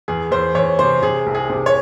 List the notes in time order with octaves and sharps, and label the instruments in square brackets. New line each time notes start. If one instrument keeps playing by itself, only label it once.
[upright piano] E2 G#4
E2 C5
E2 C#5
C3 C5
C3 G#4
C2
G#4
C3
C#5